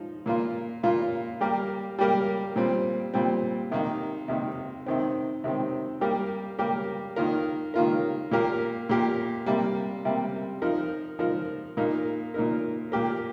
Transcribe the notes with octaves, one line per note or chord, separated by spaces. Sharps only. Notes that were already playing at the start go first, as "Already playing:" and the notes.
Already playing: F3 D#4
A#2 A#3 F4
A#2 A#3 F4
G3 A#3 G4 A#4
G3 A#3 G4 A#4
A#2 G3 C4
A#2 G3 C4
C3 D#3 A#3 D#4
C3 D#3 A#3 D#4
C3 D#3 C4
C3 D#3 C4
G3 A#3 G4 A#4
G3 A#3 G4 A#4
D#3 A#3 F4 A#4
D#3 A#3 F4 A#4
A#2 A#3 G4 A#4
A#2 A#3 G4 A#4
C3 G3 A#3
C3 G3 A#3
F3 D#4 A#4
F3 D#4 A#4
A#2 A#3 D#4 A#4
A#2 A#3 D#4 A#4
A#2 A#3 G4 A#4